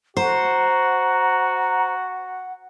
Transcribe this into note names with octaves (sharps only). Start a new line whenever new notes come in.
F#4 C5 F#5 A#5